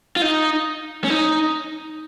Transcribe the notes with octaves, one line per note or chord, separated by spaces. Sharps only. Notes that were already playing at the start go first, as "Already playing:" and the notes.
F4
D#4
C#4
D#4